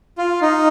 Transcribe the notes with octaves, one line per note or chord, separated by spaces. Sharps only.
F4
D#4